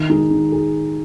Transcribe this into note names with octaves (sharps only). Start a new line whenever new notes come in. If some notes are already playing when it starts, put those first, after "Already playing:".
Already playing: D#3
G#3 D#4 G#4
D#3
G#4